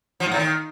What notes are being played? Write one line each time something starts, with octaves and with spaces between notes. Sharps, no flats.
F3
G#2
A2
D#3